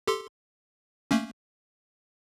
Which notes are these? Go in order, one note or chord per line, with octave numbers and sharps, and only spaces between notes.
G4 A4 C6
A3 A#3 C#4